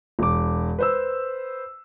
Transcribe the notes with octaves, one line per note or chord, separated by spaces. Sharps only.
E1 D6
B4 C5 E6